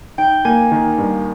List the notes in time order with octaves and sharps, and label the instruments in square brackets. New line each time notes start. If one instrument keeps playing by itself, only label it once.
[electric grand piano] D#4 [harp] G5
[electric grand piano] A#3 [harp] G#5
[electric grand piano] D#3
G2